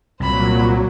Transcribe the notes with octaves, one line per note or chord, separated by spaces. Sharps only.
C2 A#2 F#3 C5 B5